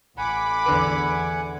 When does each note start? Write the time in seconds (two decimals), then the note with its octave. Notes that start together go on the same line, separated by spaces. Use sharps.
0.18 A1 F#5 G#5 B5 D6
0.66 E2 D3 B4